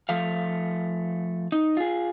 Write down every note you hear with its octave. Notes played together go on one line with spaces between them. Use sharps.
F3 A3 F5
D#4
F4 G#4